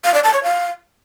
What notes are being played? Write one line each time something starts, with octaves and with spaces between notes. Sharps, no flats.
F5
D5
A5
C#5
F5